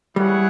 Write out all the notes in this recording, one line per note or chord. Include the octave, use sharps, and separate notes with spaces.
G3 E4 G#4 C#5 F#5